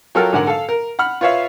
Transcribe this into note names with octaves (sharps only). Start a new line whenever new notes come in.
F#3 F4 A4 A#4 G5 F6
G#2 D3 A#4 F#5 G#5
A4 F5
A#4
F#5 B5 F6
F4 B4 C#5 E5 F5